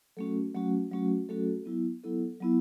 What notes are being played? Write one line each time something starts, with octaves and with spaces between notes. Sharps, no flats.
F#3 A3 C#4 F#4 A4
F#3 A3 C#4 F#4
F#3 A3 C#4 F#4
F#3 A3 C#4 F#4 A4
F#3 B3 E4
F#3 B3 E4 A4
F#3 B3 E4